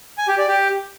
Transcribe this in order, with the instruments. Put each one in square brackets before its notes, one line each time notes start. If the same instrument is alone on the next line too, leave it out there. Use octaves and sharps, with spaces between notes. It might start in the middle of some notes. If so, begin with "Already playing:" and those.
[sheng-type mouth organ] G#5
G4
D5
G4